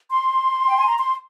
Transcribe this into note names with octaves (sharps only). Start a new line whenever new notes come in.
C6
G5
G#5
A#5
C6